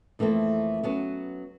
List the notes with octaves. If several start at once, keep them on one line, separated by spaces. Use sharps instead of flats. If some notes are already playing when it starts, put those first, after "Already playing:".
F2 E3 A3 A#3 C4
F#3 B3 C#4